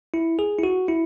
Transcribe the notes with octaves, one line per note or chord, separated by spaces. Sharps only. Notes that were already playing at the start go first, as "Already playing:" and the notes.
E4
G#4
E4
F#4
E4